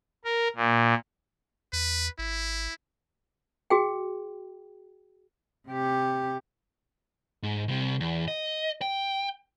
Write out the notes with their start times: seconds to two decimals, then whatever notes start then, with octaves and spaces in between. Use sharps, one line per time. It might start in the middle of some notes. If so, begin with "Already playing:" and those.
0.25 A#4
0.56 A#2
1.73 E2 B4
2.19 G#1 E4
3.70 F#4 G#4 G5
5.69 C3 G4
7.43 G#2
7.68 C2 C3
8.00 E2
8.28 D#5
8.81 G5